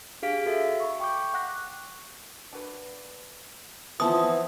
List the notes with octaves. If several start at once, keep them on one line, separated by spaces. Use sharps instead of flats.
D4 G4 G#4 F5 B6 D7
F#4 A4 E5
B5 C#6
G5 C#6 D6 G6
F#5 F#6 A#6
D4 F#4 B4
E3 F3 B3 C4 C5 A5 D#6